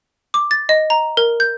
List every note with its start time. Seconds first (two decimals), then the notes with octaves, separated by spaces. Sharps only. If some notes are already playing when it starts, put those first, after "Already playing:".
0.34 D6
0.51 A6
0.69 D#5
0.90 A#5
1.17 A#4
1.40 G6